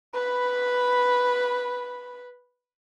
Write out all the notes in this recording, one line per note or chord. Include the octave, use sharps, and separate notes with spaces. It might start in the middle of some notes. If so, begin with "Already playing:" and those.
B4 B5